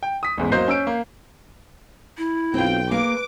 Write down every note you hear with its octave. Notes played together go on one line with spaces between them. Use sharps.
G5
D#6 B6
A1 E2 G#2
F#3 A#3 C5 D#5 G6 C7
C#4 E6 D7
A#3
E4
B1 C4 F4 G5
A#3 G#4 B4 F5 D6